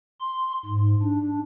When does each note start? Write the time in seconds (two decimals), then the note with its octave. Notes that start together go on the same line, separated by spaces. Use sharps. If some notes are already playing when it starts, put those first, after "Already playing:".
0.20 C6
0.65 G#2
1.03 D4